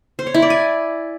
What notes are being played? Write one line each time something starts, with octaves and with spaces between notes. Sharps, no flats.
C5
C#5
E4
D5
G#5